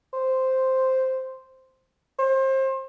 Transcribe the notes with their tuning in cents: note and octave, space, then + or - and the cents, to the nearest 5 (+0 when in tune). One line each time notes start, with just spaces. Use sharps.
C5 +0
C5 +30